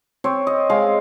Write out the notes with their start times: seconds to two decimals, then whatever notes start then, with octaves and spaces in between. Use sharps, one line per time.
0.24 C4 C#5
0.47 D#5
0.70 G#3 F5